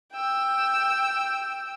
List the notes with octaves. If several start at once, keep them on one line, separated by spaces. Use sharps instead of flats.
G5 E6